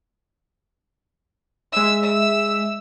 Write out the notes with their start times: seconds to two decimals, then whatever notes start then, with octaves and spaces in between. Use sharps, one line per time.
1.73 G#3 E5 E6
2.04 E6